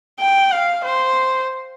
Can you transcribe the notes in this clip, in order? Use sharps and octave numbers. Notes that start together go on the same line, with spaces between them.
G5
F5
C5